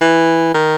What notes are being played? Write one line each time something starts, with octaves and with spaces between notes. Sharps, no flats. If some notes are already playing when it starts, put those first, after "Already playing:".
E3
D#3